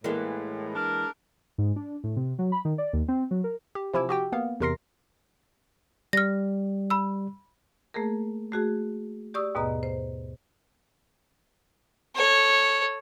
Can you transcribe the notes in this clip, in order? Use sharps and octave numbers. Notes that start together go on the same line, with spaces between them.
A2 E3 G#3 A#3
D4 A#4
G#2
D4
A2
C3
F#3
B5
D#3
D5
D#2
C4
F#3
A#4
G4
C3 F3 E4 G#5 D6 E6
F#4 G4 G5
A#3 B3 F5
E2 C3 A#4 C6 A#6 C7
G3 F6 A#6
B5 E6
A3 A#3 G#4 A#4
A3 F#4 G#4
G4 D5 C#6 D#6 E6
D#2 G#2 B2 B3 D#5 A#5
C5
A4 C#5